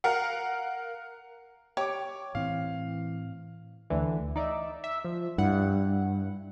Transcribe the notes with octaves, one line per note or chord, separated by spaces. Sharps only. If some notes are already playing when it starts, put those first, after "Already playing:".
A#4 F5 F#5
G4 C#5 C#6 D6
A2 E3 C4 F5
D2 D3 E3
D#4 D5 E5
E5
F3
G2 E4 F#5